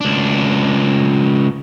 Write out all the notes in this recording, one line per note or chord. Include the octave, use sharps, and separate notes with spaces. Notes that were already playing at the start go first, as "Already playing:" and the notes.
C#2 D4